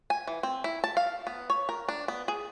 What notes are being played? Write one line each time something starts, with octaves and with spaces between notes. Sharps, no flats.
G#5
E3
C4
E4
A5
F5
B3
C#5
A#4
D4
B3
G#4